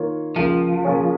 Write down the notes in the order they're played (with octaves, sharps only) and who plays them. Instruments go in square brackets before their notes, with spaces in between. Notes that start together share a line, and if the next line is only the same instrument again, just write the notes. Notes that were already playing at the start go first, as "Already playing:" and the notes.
Already playing: [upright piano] D#3 A#3 F4 C#5
[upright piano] C#2 C#3 A#3 F4 [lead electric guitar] F3
[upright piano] C#3 A#3 F4 G#4 C#5